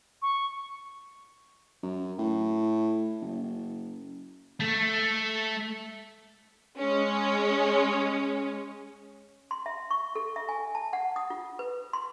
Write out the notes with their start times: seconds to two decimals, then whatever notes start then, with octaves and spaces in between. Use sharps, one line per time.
0.22 C#6
1.83 F#2
2.18 A2
3.21 F#1
4.60 A3
6.78 G#3 C#4
9.51 C6
9.66 E5
9.91 C#6
10.15 A4
10.36 E5
10.49 G#5
10.75 A5
10.93 F#5
11.16 D#6
11.30 F4
11.59 B4
11.93 C6